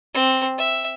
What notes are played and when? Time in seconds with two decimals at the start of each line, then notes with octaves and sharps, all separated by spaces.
0.14 C4
0.58 E5